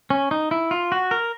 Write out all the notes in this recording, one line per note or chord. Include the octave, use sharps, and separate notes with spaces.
C#4
D#4
E4
F4
F#4
A#4